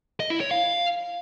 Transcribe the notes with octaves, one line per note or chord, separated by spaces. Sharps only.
D#5
E4
C#5
F5